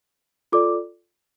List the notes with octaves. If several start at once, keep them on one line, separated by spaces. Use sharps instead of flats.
F4 A4 D5 D6